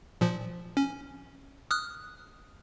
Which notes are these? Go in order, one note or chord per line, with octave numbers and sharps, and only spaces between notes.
A#2 F3
C#4
D#6 F6 F#6